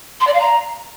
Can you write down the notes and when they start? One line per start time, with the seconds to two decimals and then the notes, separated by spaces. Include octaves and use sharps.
0.20 C6
0.26 D5
0.33 F5
0.39 A#5